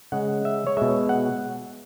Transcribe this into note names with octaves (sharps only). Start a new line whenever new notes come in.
C#3 G#3 F#5
E5
C#5
B2 G#3 E5
F#5